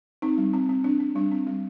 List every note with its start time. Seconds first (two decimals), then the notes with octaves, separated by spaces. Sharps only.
0.22 C4 D#4
0.38 G3
0.53 C4
0.69 C4
0.84 C4 D4
1.00 C4
1.15 G3 D4
1.32 C4
1.47 G3